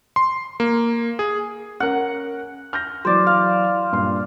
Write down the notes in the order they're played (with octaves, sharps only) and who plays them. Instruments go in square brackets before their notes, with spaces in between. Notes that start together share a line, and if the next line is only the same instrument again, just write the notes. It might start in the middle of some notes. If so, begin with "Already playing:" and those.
[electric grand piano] C6
A#3
G#4
[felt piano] C#4 A#4 [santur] F#5
[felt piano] F6 G6 A#6
[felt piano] E3 F#3 F#4 [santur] C5 D5
[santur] F5
[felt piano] G2 A#2 C6